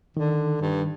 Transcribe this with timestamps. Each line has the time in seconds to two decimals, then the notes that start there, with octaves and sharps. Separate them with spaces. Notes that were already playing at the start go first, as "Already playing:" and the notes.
0.17 D3 D#3
0.61 G2